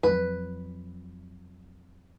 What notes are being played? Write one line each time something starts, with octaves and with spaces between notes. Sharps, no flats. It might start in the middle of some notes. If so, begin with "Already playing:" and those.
F2 F#3 B4